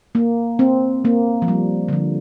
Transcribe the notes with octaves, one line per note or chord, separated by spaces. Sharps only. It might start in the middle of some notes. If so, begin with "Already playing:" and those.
A#3
C4
A#3
F3
G3
D3
F3